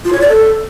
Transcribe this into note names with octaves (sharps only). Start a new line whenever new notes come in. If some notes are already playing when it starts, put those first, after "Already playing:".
F4
C#5
D5
A4